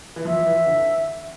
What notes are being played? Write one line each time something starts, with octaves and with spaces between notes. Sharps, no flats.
E3
F3 E5
E3
D3